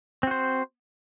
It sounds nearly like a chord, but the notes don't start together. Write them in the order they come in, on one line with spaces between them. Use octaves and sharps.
C4 F#4 C5